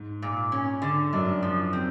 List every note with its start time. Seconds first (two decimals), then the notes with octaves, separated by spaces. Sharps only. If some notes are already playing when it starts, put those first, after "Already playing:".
Already playing: G#2
0.22 A#2
0.52 C#4
0.82 D3
1.13 F#2 D4
1.43 F3
1.73 C4